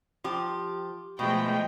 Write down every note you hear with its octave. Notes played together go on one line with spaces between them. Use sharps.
F3 G4
B2 F3 G#3 A3 G5